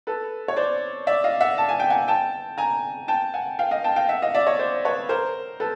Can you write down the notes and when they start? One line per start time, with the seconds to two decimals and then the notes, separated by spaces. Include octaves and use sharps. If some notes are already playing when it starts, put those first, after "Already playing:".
0.07 A4 B4
0.48 C#5
0.57 C5 D5
1.07 D5 E5
1.24 D#5 F5
1.41 E5 F#5
1.58 A5
1.69 G#5
1.80 G5
1.90 F#5 G#5
2.08 G5 A5
2.58 G#5 A#5
3.08 G5 A5
3.34 F#5 G#5
3.59 F5 G5
3.71 D#5 F5
3.84 G5 A5
3.96 F5 G5
4.09 E5 F#5
4.22 D#5 F5
4.34 D5 E5
4.46 C#5 D#5
4.59 C5 D5
4.85 B4 C#5
5.09 A#4 C5
5.60 A4 B4